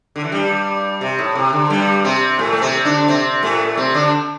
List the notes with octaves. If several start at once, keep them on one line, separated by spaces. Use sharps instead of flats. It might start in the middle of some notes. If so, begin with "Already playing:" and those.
D3
E3
G2 G3
C3
A2
C3
D3
G2 G3
C3 C4
A2 A3
A3
C3 C4
D3 D4
C3 C4
A2 A3
C3 C4
D3 D4